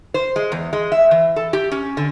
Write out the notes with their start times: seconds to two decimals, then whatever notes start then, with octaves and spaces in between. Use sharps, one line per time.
0.14 C5
0.36 G#3
0.52 E2
0.73 G#3
0.92 E5
1.11 E3
1.36 A4
1.53 G4
1.72 C#4
1.97 D3